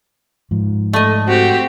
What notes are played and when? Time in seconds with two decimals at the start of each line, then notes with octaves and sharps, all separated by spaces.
0.51 G#2 F3
0.93 A3 D#5
1.27 C4 F#4 G4